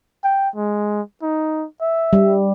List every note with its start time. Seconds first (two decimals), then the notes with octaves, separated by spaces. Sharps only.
0.24 G5
0.56 G#3
1.22 D#4
1.81 E5
2.13 G3